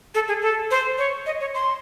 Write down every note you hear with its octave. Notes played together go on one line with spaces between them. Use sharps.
A4
G#4
A4
C5
C#5
D#5
C#5
C6